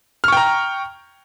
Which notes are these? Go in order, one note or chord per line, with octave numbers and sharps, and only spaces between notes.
G5 A#5 C#6 F6